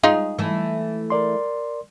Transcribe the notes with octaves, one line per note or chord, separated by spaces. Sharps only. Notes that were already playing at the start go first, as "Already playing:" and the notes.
G#3 D#4 F4 G#4
E3 A3
A#4 D5 C6